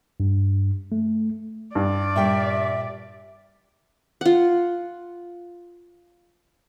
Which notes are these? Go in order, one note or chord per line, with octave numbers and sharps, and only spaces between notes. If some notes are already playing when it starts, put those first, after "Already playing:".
G2
A3
G2 D5
A#2 G3 E5 G5
F4 F#5